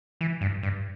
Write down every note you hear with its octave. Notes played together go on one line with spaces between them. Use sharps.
E3
G2
G2